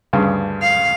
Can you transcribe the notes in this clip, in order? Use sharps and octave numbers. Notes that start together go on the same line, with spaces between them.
D2 G2 C#3
F5